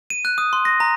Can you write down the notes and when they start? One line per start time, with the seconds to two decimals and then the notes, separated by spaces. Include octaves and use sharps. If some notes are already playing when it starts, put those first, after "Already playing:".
0.10 D#7
0.25 F#6
0.38 D#6
0.53 C6
0.65 A#6
0.80 A#5